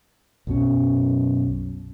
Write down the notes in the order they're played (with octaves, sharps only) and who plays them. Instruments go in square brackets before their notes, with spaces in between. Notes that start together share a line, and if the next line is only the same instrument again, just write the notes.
[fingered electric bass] B1 F#2 B2 C#4